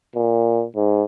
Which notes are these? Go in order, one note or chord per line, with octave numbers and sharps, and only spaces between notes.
A#2
G#2